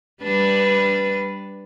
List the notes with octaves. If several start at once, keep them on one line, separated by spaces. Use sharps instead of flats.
G3 D4 B4